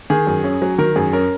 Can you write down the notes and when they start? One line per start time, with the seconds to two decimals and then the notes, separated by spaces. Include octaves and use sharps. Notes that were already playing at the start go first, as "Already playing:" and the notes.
0.10 D#3 G#4
0.27 F#2
0.44 C#4
0.62 F#3
0.78 D#3 A#4
0.96 F#2 G#4
1.13 C#4 A#4